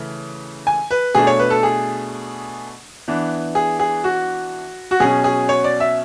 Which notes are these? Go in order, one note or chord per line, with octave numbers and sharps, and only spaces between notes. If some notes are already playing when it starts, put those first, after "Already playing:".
Already playing: C#3 E3 A3
G#5
B4
B2 A3 D4 G#4
C#5
B4
A4
G#4
E3 B3 D4
G#4
G#4
F#4
F#4
B2 F#3 C#4 G#4
G#4
C#5
D5
E5